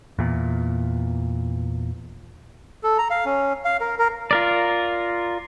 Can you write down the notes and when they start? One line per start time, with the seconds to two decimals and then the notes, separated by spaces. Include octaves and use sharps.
0.19 E2 A#2
2.83 A4
2.98 A#5
3.10 F5
3.25 C#4
3.65 F5
3.81 A#4
3.99 A#4
4.31 F4 A#4 D5